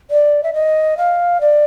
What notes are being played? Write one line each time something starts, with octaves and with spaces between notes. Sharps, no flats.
D5
E5
D#5
F5
D5